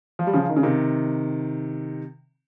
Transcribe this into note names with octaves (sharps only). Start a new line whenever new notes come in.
F3
G3
C#3 F3
D#3
C#3
C3 D#3